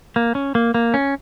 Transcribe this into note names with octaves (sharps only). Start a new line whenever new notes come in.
A#3
C#4
A#3
A#3
C#4